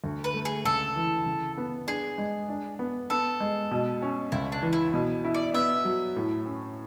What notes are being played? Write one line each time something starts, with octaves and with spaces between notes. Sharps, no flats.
D2
B4
A3
G#4
C#2 A4
E3
C#3
B3
D4 G#4
G#3
D4
B3
B3 A4
G#3
B2
C#4
C#2 E4
D4
E3
E4
B2
E4
D5
B3 E5
F#3
A2
C#4